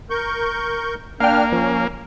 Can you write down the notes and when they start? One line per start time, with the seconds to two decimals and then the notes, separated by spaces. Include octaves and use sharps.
0.10 A#4 C#6 G6
1.20 A#3 D4 F5 G5 F6
1.52 F3 C#4